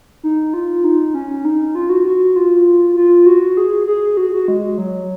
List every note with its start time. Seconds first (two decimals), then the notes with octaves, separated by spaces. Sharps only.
0.23 D#4
0.54 F4
0.84 D#4
1.14 C#4
1.45 D#4
1.75 F4
1.90 F#4
2.05 F#4
2.36 F4
2.96 F4
3.26 F#4
3.57 G#4
3.87 G#4
4.17 F#4
4.32 F#4
4.48 G#3
4.78 F#3